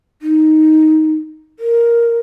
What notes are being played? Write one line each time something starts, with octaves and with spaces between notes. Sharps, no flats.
D#4
A#4